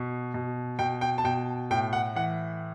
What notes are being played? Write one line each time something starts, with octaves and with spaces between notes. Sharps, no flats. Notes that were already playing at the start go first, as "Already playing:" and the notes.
Already playing: B2
B2
B2 G5
G5
A5
B2 G5
A2 G5
F#5
E3 F#5